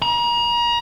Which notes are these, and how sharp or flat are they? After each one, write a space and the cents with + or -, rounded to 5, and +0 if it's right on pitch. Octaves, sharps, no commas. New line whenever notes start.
A#5 +35